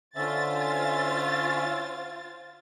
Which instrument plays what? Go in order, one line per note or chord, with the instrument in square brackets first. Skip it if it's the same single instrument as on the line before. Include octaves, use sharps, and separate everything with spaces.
[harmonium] D3 C#4 E5 [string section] F4 C5 A6